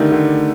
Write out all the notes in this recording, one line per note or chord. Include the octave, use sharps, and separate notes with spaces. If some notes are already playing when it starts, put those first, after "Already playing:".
Already playing: D3 D#3 G3 A3
D3